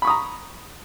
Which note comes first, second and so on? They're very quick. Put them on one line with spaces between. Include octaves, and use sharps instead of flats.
B5 C#6 D#6 A#5